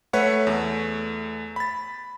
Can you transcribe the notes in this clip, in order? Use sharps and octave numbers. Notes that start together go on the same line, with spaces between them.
A3 B4 C#5 E5 F#5
E2 A3
B5 A6